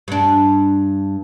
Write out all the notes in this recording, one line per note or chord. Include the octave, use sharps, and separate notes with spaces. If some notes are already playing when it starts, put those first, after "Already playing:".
G2 D4